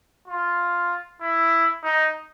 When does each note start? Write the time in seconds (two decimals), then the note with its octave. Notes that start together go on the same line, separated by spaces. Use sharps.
0.28 F4
1.21 E4
1.83 D#4